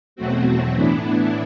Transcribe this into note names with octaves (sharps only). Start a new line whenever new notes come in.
E2 B2 F#3 A3 C4 F#4
A2 E3 B3 D4 E4